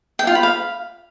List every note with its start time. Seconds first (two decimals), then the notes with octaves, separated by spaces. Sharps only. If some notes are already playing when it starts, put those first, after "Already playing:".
0.19 G5
0.27 F4
0.35 B5
0.43 F5